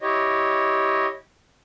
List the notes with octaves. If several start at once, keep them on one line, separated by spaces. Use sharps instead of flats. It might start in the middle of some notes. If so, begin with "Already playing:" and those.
E4 G4 C#5 D#5